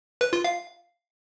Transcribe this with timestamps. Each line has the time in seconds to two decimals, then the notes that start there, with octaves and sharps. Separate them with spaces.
0.21 B4
0.33 F4
0.44 F5